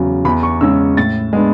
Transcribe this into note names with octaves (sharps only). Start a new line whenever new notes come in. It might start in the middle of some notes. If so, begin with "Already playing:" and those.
Already playing: E2 C#3 F#3
E2 B5
C#6
C#3 G#3 C#4 E6
A2 A6
G#3 B3 D4